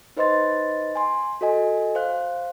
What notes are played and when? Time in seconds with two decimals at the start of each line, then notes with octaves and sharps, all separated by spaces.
0.17 D#4 B4 C5 D#5 C6 A6
0.95 G#5 C6
1.41 F#4 A4 D#5 G#5
1.95 C5 F5 F#6